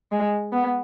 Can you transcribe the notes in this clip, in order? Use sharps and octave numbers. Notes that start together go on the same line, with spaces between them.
G#3
B3